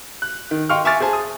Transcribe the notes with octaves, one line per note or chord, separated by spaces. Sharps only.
F#6
D#3
D#5 F5 G5 C6 C#6 F6
E5 G#5 C#6 D6 F6 A6
G#4 C5 G#5 A5
D#6